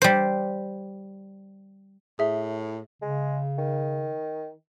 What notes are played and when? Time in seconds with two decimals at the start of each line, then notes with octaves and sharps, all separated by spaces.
0.02 G3 C5
2.19 A2 G#4 E5
3.02 C#3 G#3
3.58 D#3